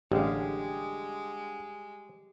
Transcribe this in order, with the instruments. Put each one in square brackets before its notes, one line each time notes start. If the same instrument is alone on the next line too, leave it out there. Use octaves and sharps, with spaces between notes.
[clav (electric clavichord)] A1 [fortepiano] D3 F5 [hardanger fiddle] G#3 [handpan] G4 G#4